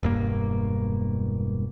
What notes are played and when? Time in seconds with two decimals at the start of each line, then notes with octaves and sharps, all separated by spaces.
0.03 E1 G2 A#3